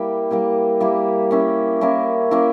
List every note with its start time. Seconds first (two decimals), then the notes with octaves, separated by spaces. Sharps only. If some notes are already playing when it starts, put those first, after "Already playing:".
Already playing: G3 A#3 E4 G4
0.30 G3 A#3 E4 G4
0.80 G3 A#3 E4 G4
1.31 A#3 C#4 E4 A#4
1.81 A#3 C#4 E4 A#4
2.31 A#3 C#4 E4 A#4